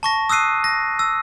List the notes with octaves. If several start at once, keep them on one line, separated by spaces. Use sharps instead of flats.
A5 C#6 A#6
D#6 E6 F#6 C7 D#7
A#6
E6